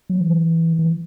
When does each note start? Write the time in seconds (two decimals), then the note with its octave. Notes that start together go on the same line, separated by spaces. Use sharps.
0.10 F#3
0.21 E3
0.79 E3